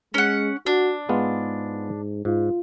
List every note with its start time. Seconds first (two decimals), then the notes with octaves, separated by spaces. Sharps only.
0.14 G#3 C#4 F#5
0.66 D4 F#4
1.09 G#2 G#3 B3 F4
2.25 G#2 F4